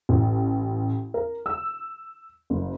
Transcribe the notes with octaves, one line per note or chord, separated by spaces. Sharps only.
A1
A#4
E6
F#1